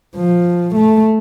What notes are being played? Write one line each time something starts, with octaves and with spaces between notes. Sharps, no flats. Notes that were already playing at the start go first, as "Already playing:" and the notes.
F3
A3